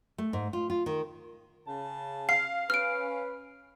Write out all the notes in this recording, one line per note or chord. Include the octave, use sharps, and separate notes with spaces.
A3
G#2
F4
F4
D#3
C#3 A5
F5 C7
C#4 B4 F6 D7